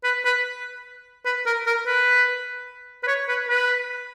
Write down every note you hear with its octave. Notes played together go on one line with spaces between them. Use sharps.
B4
B4
B4
A#4
A#4
B4
B4
C#5
B4
B4